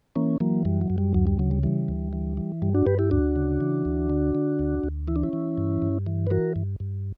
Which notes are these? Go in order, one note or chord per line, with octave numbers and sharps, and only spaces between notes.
E3 A#3 C#4
E3 F#3 A#3
F#2 G3
F#3
F#2
G3
D2 F#3
G3
C#3 F#3
G3
E3 G3
D2
E3
E3
G2 G3
D4 F#4
G2 G4 B4
E4 G4
D2 D4 F#4
C#3
E3
D2
D3
D3
D2
D2
E3 E4
D4
C#4 E4
E3
G2
G2
E3
B4
E3 F#4 A#4
G2
G2